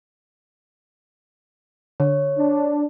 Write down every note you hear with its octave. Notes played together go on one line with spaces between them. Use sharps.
D3 C#5
D4